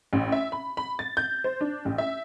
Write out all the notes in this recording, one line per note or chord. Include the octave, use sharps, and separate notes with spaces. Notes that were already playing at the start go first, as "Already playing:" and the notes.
A1
E5
B5
B5
A6
G6
C5
D4
A1
E5